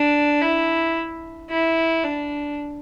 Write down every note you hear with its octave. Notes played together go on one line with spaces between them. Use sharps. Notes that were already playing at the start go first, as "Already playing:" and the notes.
Already playing: D4
E4
E4
D4